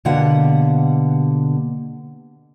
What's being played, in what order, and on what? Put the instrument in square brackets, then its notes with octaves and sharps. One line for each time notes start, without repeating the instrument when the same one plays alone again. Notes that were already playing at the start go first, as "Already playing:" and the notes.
[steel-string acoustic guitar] B2 D3 A#3 G4 F#5